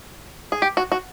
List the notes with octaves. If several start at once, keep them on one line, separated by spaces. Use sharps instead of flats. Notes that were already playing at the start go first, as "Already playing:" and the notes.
G#4
G4
F#4
F#4